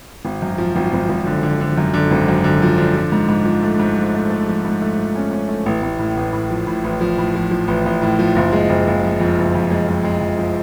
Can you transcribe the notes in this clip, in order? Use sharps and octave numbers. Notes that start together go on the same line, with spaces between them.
G#1
F#2
F3
G#1
G#1
G#1
D3
D3
D3
F#2
D3
G#1
F#2
D3
F3
D3
F3
G#2
G#2
F3
A3
G#2
F3
A3
A3
F3
G#2
A3
F3
C#4
C#4
A3
A1
A1
A2
A1
A2
F3
A2
A1
F3
A2
F3
F3
A1
A1
A2
F3
F#1
G#3
F#1
F#1
F3
F2
F#1
F2
G#3
G#3
G#3
F2
F3